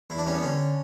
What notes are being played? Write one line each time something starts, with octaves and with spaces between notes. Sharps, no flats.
E2 E4
D4
G3 C#4
B3
D3 C#4